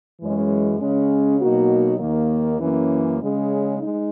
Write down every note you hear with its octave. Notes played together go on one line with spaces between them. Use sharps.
F#2 E3 G#3 C#4
C#3 G#3 C#4
B2 F#3 A#3 D#4 F#4
D#2 D#3 A#3
F#2 E3 A#3 C#4
C#3 G#3 C#4
G#3 D#4